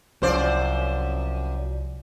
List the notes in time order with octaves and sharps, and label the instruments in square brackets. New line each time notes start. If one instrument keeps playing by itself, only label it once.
[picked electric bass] C2 F3 [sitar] F#2 C5 D5